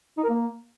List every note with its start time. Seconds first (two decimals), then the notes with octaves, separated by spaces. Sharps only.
0.17 D#4
0.23 A#4
0.29 A#3